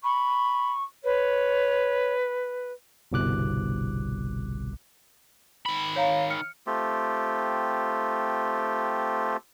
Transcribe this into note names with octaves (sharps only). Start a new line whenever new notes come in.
B5 C#6
B4 C#5
G1 C2 B2 D6 F#6
D#3 B5
C#5 F5 A#5
F6 C#7
A3 C4 F4 G4